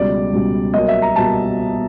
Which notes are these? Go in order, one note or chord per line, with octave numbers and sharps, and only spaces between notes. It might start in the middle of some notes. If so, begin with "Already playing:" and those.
Already playing: C#2 B2 G3 D5
C#2 B2 G3
B1 B2 G3 A#3 D#5
E5
A#5
B2 G3 A#3 A5